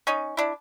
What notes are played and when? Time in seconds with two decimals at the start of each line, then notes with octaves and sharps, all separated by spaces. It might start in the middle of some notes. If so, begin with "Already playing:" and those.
0.07 C#4 D#4
0.37 D4 E4